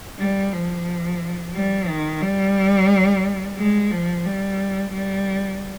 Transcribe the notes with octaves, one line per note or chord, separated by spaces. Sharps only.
G3
F3
G3
D#3
G3
G#3
F3
G3
G3